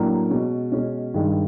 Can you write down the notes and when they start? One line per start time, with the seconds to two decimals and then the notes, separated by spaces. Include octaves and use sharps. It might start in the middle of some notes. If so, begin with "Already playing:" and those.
Already playing: A2 F#3 A#3 D4
0.30 B2 G#3 C#4
0.72 B2 G#3 C#4
1.14 G2 D#3 G#3